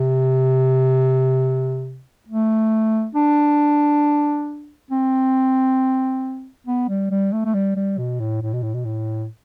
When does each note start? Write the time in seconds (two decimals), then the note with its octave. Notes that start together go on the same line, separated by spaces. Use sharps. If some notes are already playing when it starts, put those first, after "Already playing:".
Already playing: C3
2.28 A3
3.15 D4
4.91 C4
6.67 B3
6.89 G3
7.11 G3
7.32 A3
7.45 A3
7.54 G3
7.76 G3
7.98 B2
8.20 A2
8.42 A2
8.53 B2
8.63 A2
8.74 B2
8.85 A2